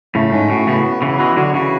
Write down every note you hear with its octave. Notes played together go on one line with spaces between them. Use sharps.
A2 C#3 A3
G#2 C#4
A2 F#4
A2 C#3 B3
B3
C#3 E3 B3
E3 G#3 F#4
D3 F#3 F#4
C#3 E3 F#4